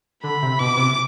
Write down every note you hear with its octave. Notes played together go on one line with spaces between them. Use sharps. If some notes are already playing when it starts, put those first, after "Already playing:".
D3 B5
C3
B2 D6
C3